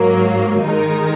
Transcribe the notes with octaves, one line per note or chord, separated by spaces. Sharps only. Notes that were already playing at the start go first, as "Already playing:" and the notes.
Already playing: G#2 F#3 A#3
D#3 G#3 D#4 A#4